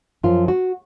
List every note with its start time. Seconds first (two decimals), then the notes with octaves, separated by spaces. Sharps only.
0.23 F#2 F3 F4
0.48 F#4